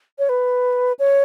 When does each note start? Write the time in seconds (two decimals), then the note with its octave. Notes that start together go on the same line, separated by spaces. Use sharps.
0.19 C#5
0.29 B4
0.99 C#5